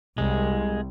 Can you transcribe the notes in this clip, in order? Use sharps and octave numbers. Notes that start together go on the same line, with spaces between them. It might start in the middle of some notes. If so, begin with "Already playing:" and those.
C2 G#3